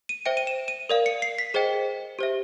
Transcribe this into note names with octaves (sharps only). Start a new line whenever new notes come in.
D#7
C5 E5 G5 D7
D#7
E7
D#7
A#4 D5 F5
C#7
C7
B6
G#4 C5 D#5 G5
G4 C5 E5